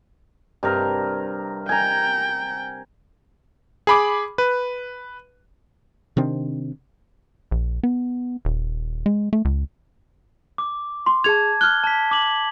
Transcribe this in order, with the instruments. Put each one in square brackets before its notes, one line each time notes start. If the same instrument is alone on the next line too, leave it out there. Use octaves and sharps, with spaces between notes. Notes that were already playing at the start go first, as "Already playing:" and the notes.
[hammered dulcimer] G2 C3 A#4
[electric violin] G5 [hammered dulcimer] G#5 A#5
[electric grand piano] G#4 B5 D6
B4
[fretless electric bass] C3 D#3 C4 D4
[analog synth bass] A#1
B3
D#1
G#3
A3
C#2
[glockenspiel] D6
[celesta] C6
[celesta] G#4 F7 [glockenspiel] A5 G#6
[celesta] F6 F#6 [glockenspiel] G7
[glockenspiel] A5 B6
D6 F#7